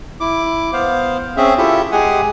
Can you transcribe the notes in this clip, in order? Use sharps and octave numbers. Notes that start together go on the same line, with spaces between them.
E4 D6
B3 C5 F5
C4 C#4 G#4 E5
E4 F4 G4 A4 E5
G#3 G4 G#4 F#5 G#5